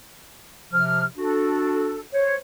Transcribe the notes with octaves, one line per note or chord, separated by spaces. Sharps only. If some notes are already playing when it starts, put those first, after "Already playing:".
C3 F3 F6
D4 F#4 A4
C5 C#5